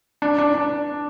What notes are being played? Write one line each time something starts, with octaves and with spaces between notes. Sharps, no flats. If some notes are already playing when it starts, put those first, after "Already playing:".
D4
D4
D4